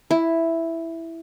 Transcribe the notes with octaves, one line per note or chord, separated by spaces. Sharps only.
E4